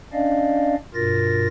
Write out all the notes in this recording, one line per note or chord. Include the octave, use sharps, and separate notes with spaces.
C#4 D4 D5 D#5 F5
G2 B2 F4 A#4 A6 A#6